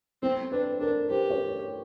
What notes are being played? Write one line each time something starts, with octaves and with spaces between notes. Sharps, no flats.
C4 C5
D4 B4
D4 A#4
G4 C5
C#5